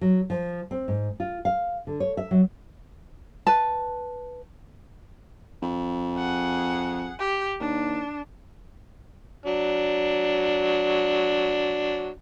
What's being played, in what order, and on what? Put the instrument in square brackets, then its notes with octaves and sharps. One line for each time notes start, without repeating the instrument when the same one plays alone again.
[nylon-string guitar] F#3
F3
C4
G#2
F4
F5
D3
C#5
E5
F#3
[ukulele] B4 A5
[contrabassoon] F2
[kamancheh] G#4 F#5
G4
[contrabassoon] D#2 [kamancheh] D4
[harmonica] F#3 D4